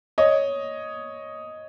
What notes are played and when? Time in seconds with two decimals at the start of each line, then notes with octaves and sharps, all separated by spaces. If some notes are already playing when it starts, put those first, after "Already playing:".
0.18 C#5 D#5